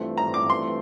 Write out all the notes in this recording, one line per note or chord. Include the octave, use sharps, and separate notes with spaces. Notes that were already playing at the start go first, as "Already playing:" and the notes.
Already playing: G2 E3 A3 C4 F4
A#5
D6
C6